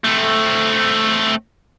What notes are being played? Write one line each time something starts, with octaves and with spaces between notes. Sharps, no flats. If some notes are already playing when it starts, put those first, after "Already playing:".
A3 C4